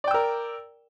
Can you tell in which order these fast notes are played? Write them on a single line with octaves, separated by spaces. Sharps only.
D5 G5 E6 A#4